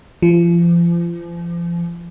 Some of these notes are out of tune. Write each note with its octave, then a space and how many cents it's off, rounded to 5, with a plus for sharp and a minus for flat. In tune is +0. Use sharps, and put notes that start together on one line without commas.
F3 -35